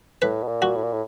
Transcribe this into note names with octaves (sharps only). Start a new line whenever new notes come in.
A2 B4
B2
A#2
F#4
A2
A#2
A2